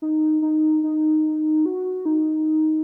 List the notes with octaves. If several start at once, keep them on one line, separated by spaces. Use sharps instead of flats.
D#4
D#4
D#4
F#4
D#4